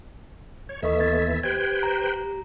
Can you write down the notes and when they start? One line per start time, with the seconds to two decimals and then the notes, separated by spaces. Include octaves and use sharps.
0.69 C#5
0.83 D#2 E3 E4 A4 D#5 E5 C#6
1.00 B3 G#6 A6
1.43 G4 B4 C5 G5 G#6
1.83 A#5